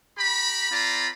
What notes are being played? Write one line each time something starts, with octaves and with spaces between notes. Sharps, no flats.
G4 A#5 B5
C4 F4 D5 A#5 B5